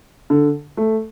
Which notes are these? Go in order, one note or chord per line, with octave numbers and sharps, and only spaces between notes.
D3
A3